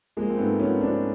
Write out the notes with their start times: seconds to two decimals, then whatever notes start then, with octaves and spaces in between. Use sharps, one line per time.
0.17 F3 G#3 A#3
0.30 C4
0.38 G#2 A3 B3
0.59 F3 B3 C#4
0.81 F3 C4 D4